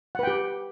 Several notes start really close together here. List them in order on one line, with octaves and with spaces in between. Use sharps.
F#5 B4 G5 G4